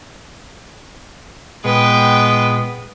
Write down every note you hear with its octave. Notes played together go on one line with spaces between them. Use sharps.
A#2 G#3 B3 B4 G5